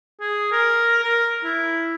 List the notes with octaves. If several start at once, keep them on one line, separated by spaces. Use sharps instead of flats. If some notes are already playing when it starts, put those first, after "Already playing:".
G#4
A#4
A#4
E4